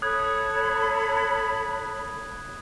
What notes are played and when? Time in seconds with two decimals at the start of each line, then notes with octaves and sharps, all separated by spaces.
0.02 A4 C#5 B5 D#6 F#6 G#6